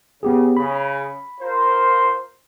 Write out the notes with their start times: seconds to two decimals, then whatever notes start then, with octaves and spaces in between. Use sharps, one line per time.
0.23 C#3 B3 G4 G#4
0.57 C#3 B5
1.41 F4 A#4 C5